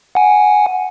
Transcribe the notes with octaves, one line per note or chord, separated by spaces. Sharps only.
F#5 G#5